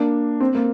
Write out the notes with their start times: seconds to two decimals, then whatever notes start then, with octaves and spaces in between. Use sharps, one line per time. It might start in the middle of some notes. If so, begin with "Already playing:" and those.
Already playing: A#3 D4
0.40 C4
0.55 A#3